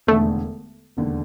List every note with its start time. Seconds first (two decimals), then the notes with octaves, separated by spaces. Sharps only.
0.07 E1 D#2 D3 A3
0.97 E1 D#2 D3